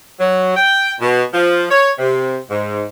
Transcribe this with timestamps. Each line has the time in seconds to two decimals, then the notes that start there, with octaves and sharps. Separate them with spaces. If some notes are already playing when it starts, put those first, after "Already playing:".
0.20 F#3
0.56 G5
1.00 B2
1.33 F3
1.70 C#5
1.99 C3
2.50 G#2